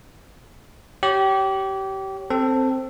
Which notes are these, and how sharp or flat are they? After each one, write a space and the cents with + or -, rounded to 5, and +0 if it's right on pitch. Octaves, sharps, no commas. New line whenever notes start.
G4 -25 C#5 +0
C4 +0 A4 +10